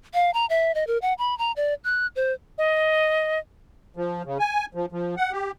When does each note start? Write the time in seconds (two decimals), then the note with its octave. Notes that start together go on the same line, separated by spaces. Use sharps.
0.14 F5
0.34 A#5
0.50 E5
0.75 D#5
0.87 A#4
1.02 F#5
1.18 B5
1.38 A#5
1.56 D5
1.84 F#6
2.16 C5
2.58 D#5
3.96 F3
4.25 C#3
4.39 G#5
4.75 F3
4.92 F3
5.17 F#5
5.32 G4